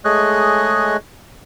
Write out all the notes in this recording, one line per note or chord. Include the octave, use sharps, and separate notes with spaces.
G#3 A3 G#4 C#5 D#5 F#6